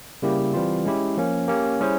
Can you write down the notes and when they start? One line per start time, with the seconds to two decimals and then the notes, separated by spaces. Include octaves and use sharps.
0.22 C#3 G3 A#3 E4 G4
0.53 E3 G3 C4 F4
0.85 G#3 C#4 E4 G4
1.17 F3 A#3 C#4
1.48 A#3 C#4 G4 C#5
1.80 G3 C#4 E4 G#4 C5